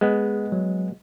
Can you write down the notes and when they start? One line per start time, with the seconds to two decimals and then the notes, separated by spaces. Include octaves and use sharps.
0.01 G#3 B3 G#4
0.52 F#3